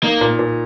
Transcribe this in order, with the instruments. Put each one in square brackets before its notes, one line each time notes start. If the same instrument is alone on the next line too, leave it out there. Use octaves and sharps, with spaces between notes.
[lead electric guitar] A#3 [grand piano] D#4
[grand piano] A#2
A#2